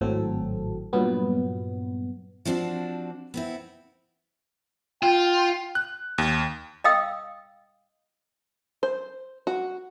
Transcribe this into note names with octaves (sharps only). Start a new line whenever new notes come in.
G#1 A2 F#3 C4 A4
G2 A#2 F#3 B3
F3 C4 D4 F#4 D5
B3 C4 E4
F4 G5
F#6
D#2
D#5 F5 G5 D#6 E6
C5
F#4